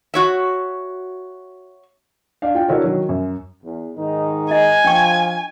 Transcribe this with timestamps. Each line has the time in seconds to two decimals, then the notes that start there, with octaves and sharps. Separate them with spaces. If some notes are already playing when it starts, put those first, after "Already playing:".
0.14 F#4 C#5 E5
2.42 D4 F5
2.55 F4 G5
2.68 D3 E4 F#4 A#4 C#5
2.84 D#3 F#3
3.09 F#2
3.64 E2
3.96 G#2 D#3 D#4
4.51 E4 D#5 G#5
4.84 F3 D4 G5 C#6